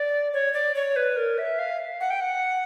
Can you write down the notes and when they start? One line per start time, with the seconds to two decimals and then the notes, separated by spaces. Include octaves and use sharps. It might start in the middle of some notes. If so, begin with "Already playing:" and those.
Already playing: D5
0.33 C#5
0.54 D5
0.75 C#5
0.96 B4
1.16 A#4
1.38 E5
1.59 F5
2.00 F#5
2.10 G5
2.20 F#5